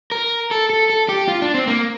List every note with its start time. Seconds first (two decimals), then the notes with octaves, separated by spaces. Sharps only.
0.11 A#4
0.51 A4
0.70 A4
0.90 A4
1.09 G4
1.28 F4
1.42 D4
1.54 C4
1.67 A#3